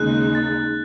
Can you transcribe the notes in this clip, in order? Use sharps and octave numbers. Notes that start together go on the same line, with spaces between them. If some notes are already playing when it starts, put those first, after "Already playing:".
Already playing: D#2 C#3 G#3 D#4 F#6
A6